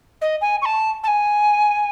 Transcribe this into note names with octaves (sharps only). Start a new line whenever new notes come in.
D#5
G#5
C#6
A5
A5
G#5